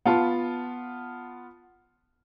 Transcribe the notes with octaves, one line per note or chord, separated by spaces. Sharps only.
B3 F4 A5